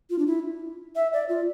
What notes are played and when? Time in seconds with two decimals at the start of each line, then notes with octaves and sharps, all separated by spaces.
0.10 F4
0.19 D4
0.27 E4
0.96 E5
1.13 D5
1.29 F4